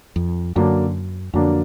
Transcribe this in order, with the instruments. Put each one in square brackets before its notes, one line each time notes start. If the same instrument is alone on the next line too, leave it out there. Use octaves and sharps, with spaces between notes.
[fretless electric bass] F2
[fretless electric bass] F#2 [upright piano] D3 F#3 A#3 D4
[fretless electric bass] F2 [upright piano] D3 F#3 A#3 D4